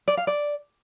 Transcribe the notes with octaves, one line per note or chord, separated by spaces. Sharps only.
D5
F5
D5